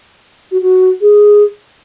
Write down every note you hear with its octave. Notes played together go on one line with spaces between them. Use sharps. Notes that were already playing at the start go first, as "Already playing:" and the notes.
F#4
F#4
G#4